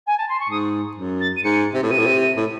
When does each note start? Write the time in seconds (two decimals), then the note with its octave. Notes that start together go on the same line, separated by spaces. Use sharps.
0.06 G#5
0.17 A5
0.28 C6
0.39 C#6
0.49 G#2 D#6
0.97 F#2
1.20 A6
1.36 D#7
1.43 G#2 C#7
1.74 C3
1.83 A2
1.90 C3 D#7
1.99 A2
2.06 C3
2.37 A2